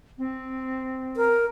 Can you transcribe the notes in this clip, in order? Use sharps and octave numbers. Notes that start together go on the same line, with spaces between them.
C4
A#4